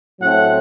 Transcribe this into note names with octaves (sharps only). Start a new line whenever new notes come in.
A2 F#3 A3 C4 F#5